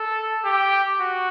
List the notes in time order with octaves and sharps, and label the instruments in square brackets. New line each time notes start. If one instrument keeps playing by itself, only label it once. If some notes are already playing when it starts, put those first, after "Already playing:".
Already playing: [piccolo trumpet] A4
G4
F#4